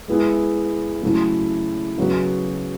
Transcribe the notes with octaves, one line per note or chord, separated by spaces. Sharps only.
G#3 B3 E4 G#4
C#3 F#3 A3 E4
C#3 F#3 B3 F#4